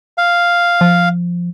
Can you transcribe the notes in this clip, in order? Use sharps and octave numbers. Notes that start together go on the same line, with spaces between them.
F5
F3